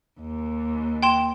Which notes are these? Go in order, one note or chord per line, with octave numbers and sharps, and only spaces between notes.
D#2
G5 C6 E7